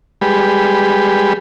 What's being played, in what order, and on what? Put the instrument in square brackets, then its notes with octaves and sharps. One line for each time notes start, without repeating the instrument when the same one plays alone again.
[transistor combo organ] G3 G#3 G4 B4